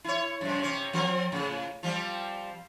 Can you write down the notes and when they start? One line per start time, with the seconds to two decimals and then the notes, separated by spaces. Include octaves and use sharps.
0.04 E4 C#5
0.41 F#2 C3
0.59 C3 C#4
0.93 F3 C4 A#4
1.32 A2 C#3
1.83 F3 G3 C4